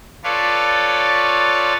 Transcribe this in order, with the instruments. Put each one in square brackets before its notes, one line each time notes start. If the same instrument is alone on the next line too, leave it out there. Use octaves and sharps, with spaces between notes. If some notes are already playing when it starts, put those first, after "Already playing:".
[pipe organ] F4 A4 B4 C#5 D5 F5